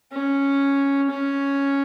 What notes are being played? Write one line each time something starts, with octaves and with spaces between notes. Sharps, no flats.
C#4
C#4